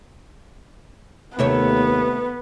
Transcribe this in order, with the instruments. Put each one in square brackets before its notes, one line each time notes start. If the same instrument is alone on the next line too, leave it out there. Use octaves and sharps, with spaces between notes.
[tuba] D#2 [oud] C3 A3 C#5 [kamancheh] B3